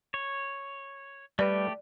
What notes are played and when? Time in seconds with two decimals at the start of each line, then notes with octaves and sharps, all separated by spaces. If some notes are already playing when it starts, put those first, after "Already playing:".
0.14 C#5
1.39 G3 A3 G4 B4 D5